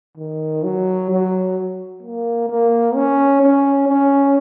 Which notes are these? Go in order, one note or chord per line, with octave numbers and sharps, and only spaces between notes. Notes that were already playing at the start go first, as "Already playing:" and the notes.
D#3
F#3
F#3
A#3
A#3
C#4
C#4
C#4